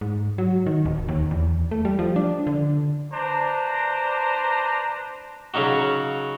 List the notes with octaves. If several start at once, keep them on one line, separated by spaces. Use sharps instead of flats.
G#2
F#3
D#3
D1
D#2
E2
A3
G3
F3
D4
D3
D4 B4 C5 A#5
C#3 F#3 C#4 D#4 F#4